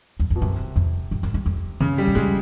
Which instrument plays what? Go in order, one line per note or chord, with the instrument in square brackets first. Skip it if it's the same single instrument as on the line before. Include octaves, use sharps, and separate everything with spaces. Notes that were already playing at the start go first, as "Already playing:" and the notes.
[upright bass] E2
F2
[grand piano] B2
[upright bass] F#2 [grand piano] C3
[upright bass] F2
F#2
F#2
F2
F2
[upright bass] F#2 [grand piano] C#3
[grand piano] G3
[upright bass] F#2
[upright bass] F2 [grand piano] G#3